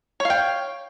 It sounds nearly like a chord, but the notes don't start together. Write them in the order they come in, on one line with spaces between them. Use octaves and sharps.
C#5 F5 G5